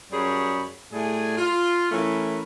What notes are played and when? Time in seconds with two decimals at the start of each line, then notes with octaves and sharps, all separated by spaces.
0.12 F#2 G3 G#4 C#5 B5
0.92 A2 G3 A3 G#4 G#5
1.38 F4
1.92 E3 A3 C#4 E4 A#4